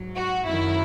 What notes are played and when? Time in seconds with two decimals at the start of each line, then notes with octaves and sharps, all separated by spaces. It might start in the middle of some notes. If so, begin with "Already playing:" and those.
Already playing: G#2 F#3
0.15 F#4
0.46 F#2 D#3 F#3 E4